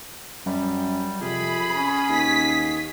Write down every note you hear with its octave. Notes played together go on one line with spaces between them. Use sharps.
F#2 G3
F2 C3 G#4 B5
C#4
D#2 B6